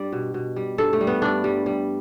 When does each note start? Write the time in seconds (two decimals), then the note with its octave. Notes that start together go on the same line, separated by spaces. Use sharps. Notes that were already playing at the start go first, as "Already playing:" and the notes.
Already playing: G2 G3 D5
0.12 B2
0.34 B2
0.56 G3
0.78 G2 A4
0.93 A3
1.01 G3
1.07 B3
1.22 G2 D4
1.44 G3
1.66 G3